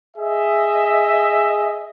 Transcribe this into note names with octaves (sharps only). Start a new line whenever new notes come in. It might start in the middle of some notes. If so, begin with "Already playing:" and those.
G#4 D#5 E5